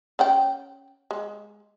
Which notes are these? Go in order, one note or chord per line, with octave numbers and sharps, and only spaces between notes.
C#4 F#5 G5
G#3